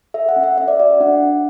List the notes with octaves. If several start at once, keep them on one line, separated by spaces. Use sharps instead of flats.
A4 E5
F#5
C#4
E5
C#4 E5
D5
F#4 D5
D4 F#5
D4